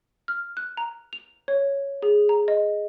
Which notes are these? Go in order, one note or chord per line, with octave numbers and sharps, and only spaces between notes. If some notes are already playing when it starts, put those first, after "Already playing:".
F6
F#6
A#5
F7
C#5
G#4
A#5
D#5